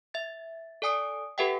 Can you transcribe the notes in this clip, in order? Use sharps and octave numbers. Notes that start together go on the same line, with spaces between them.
E5 A6
A4 D5 G#5 D#6 D7
G4 A4 B4 E5 F#5 G5